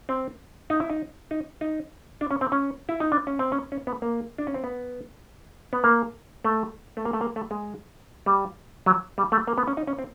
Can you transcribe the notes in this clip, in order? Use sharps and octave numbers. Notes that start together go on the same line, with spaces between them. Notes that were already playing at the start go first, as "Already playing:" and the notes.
C4
D#4
E4
D#4
D#4
D#4
D4
C#4
C4
C#4
E4
D#4
D4
C#4
C4
C#4
C#4
B3
A#3
D4
C#4
C4
B3
B3
A#3
A3
A3
A#3
A3
A#3
A3
G#3
G3
F#3
G3
A3
A#3
B3
C#4
D#4
C#4
C4